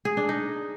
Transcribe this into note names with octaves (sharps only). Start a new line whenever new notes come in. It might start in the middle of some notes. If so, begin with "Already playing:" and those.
G#4
D4
D#4